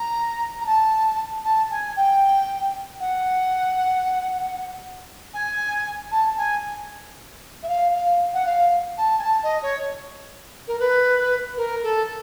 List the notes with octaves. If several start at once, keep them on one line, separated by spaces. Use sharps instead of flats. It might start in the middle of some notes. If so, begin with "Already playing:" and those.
Already playing: A#5
A#5
A5
A5
G#5
G5
F#5
G#5
A5
G#5
E5
F5
F5
F#5
F5
A5
G#5
A5
D#5
C#5
A#4
B4
A#4
A4